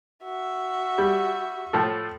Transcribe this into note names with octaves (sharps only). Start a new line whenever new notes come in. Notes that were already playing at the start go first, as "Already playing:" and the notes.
F#4 E5
G3
A2 F3 A4